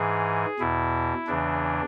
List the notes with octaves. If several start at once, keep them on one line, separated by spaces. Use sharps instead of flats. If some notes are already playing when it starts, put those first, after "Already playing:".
Already playing: G#2 E3 G#4
E2 B2 E4
E2 C#3 E3 D4